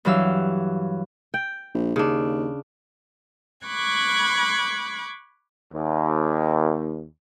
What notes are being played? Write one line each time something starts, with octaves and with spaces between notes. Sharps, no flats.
G2 E3 F#3 F5 E6
G5
A#1
D#2 C#3 D4
B5 C#6 D6 F#6 G#6
D#2